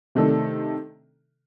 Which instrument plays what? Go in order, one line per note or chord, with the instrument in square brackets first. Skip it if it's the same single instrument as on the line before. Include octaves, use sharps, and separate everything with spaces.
[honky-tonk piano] C3 D#3 A3 D4 A4